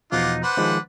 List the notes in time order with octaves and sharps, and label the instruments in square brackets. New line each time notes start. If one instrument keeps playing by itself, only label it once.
[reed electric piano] E2 B2 F3 [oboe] D#4 [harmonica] F4 F#5 D6
[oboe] D4 [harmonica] B4 C5 F#5
[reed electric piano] D#3 F3 G#3 [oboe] D4